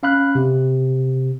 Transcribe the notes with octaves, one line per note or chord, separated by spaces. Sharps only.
C#4 F5 B5 F#6
C3